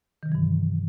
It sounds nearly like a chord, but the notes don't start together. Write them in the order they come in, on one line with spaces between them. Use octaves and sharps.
D#3 C3 F#3 E3 G2